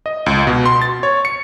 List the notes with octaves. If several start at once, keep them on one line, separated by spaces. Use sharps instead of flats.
D#5
C#2
B2
C6
A6
C#5
C#7